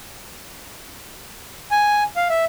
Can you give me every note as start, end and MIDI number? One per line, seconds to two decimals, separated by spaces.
1.71 2.03 80
2.16 2.28 77
2.29 2.45 76